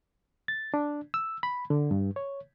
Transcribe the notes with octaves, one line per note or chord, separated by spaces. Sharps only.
A6
D4
E6
B5
D3
G2
C#5